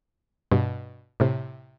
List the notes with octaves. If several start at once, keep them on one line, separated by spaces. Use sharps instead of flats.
G2 B2
A2 C3